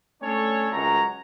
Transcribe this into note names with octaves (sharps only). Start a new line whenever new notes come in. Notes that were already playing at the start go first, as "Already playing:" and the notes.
A3 C#4 D4 A4 C#5
C#2 F#2 C#5 A#5